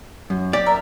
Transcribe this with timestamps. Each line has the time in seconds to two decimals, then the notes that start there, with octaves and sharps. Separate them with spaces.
0.30 F#2
0.53 G4 D5
0.66 A#4 E5